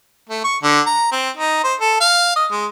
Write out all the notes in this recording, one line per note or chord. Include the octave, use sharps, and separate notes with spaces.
A3
C#6
D3
A#5
C4
D#4
C5
A4
F5
D#5
G#3